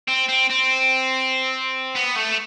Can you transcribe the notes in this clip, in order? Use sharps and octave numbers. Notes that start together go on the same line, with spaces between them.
C4
C4
C4
B3
A3